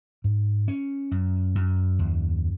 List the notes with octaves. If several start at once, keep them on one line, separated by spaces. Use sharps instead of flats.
G#2
C#4
F#2
F#2
D#2